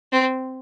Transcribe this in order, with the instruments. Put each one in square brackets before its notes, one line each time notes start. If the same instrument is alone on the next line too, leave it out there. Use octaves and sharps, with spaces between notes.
[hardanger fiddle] C4